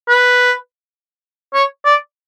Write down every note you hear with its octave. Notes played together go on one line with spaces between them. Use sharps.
B4
C#5
D5